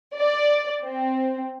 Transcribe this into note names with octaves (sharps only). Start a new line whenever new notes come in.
D5
C4